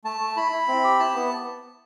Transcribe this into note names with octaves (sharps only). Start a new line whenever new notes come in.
A3 A5
A3
E4 B5
E4
C4
G4
E4 A5
B3